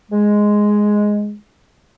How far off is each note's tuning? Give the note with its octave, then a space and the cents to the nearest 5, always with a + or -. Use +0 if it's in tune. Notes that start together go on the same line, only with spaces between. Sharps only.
G#3 +0